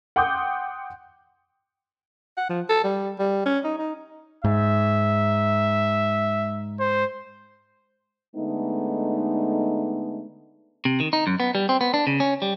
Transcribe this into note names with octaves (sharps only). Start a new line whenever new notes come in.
F#5 G5 C6 D6 D#6 G6
F#5
F3
A4
G3
G3
C#4
D#4
D#4
G#2 E5
C5
D3 G#3 A3 B3 D#4
C3
D#3
D#4
F#2
B3
G3
C4
B3
D4
C#3
C#4
G3